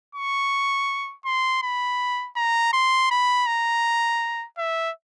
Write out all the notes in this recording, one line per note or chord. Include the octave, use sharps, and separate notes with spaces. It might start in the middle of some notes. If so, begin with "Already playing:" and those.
C#6
C6
B5
A#5
C6
B5
A#5
E5